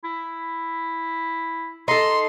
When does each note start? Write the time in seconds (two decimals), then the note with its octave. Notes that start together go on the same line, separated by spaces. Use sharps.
0.04 E4
1.88 D#4 A4 C6